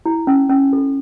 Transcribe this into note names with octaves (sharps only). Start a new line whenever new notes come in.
E4
C#4
C#4
A4